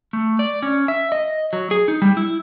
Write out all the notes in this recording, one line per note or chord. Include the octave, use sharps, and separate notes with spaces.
A3
D5
C#4
E5
D#5
F#3
G#4
D#4
G3
E4